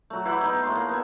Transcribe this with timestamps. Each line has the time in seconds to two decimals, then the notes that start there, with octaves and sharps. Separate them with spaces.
0.10 F#3 A3
0.25 E3 E4 G4 F#5
0.43 B3 D#4
0.63 A2 A3 C6
0.75 A#3
0.89 B3 A4 G#5